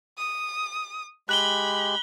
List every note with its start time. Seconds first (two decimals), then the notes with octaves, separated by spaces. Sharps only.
0.18 D#6
1.29 G#3 G4 B5 F#6 F#7 G7